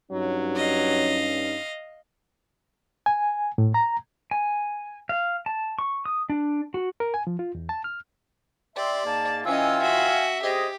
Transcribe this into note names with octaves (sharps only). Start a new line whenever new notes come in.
G2 F#3 C#4 D#4
D#5 F5
G#5
A2
A#5
G#5
F5
A5
C#6
D#6
D4
F#4
A#4
G#5
F3
F4
E2
A5
F6
G4 D5 E5 C6
G#2 A#3 A5
E3 C#4 F4 D#5 F5 G5 G#5 E6
F#4 E5
C4 G4 G#4 D#5